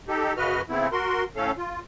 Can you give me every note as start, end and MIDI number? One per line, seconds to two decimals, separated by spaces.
0.08 0.33 63
0.08 0.33 67
0.08 0.33 69
0.37 0.61 42
0.37 0.61 49
0.37 0.61 66
0.37 0.61 71
0.37 0.61 75
0.37 0.61 89
0.70 0.88 49
0.70 0.88 57
0.70 0.88 59
0.70 0.88 60
0.70 0.88 64
0.92 1.24 66
0.92 1.24 70
0.92 1.24 84
1.36 1.51 45
1.36 1.51 57
1.36 1.51 61
1.36 1.51 69
1.36 1.51 77
1.58 1.80 65